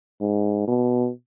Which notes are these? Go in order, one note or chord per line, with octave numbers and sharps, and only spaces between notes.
G#2
B2